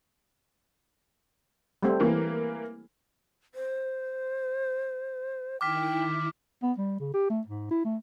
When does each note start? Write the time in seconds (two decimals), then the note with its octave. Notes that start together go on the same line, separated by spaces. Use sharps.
1.83 G3 A3 C4
2.00 E3 A#3
3.55 C5
5.61 D#3 E4 G5 D6 F6 B6
6.63 B3
6.78 G3
7.00 C#3
7.14 G4
7.30 A3
7.47 G#2
7.71 E4
7.85 A3